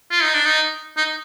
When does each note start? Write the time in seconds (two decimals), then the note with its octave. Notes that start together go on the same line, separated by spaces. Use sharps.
0.11 F4
0.22 D#4
0.34 D4
0.45 D#4
0.97 D#4